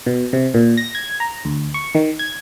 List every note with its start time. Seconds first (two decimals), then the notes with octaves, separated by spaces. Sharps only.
0.06 B2
0.33 C3
0.54 A#2
0.77 A#6
0.95 G#6
1.20 A#5
1.45 D2
1.74 C#6
1.95 D#3
2.19 G#6